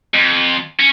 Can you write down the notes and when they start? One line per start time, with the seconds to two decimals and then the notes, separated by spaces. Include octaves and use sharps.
0.14 F2
0.79 C#4